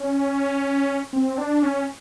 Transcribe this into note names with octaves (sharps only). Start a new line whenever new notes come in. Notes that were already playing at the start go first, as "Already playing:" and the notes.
Already playing: C#4
C4
D4
C#4